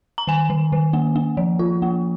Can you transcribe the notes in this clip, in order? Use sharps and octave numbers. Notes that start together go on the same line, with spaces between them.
A#5
D#3 G#5
D#3
D#3
A#3
A#3
F3
F4
A#3